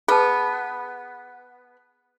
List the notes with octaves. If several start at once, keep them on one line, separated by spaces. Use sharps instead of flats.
B3 G#4 B4 A5